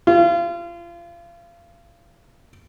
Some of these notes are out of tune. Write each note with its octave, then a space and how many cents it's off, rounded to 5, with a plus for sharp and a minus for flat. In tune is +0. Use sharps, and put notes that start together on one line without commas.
F4 -30